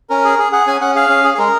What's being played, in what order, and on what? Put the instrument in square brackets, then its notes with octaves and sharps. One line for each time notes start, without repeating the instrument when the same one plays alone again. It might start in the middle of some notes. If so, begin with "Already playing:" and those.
[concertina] C#4 A#4
G#4
G#4
G#4 F#5
C#4 G#5
C#4 F#5
G#4 F5
C#4
G#4
G#4
G#3 A#4